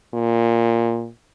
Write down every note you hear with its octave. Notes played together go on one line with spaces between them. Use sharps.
A#2